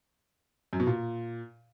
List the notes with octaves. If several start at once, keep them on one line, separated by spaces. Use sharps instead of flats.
F#2
B2
A#2